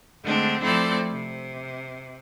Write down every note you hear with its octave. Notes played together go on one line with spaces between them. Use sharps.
D3 G#3 A3 C4 D4
F3 A3 C4 E4 A4 D5
C3